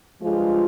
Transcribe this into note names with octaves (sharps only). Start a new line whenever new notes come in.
G2 F3 G#3 F4